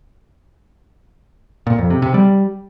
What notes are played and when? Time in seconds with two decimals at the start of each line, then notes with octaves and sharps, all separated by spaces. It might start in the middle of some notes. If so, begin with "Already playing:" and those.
1.67 A#2
1.78 F2
1.90 C3
2.02 C3
2.14 G3